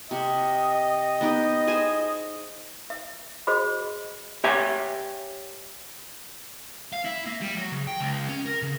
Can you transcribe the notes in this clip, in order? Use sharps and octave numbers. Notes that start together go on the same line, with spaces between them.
C3 D#5
B3 D#4 G4
G#4 C5 G#5
E5
F#4 G#4 C5 D#5 B5
G4 C#5 E5 G#5
F5
E4
A#3
G3
F#3
C#3
G5
C#2
C#4
A#4
C#3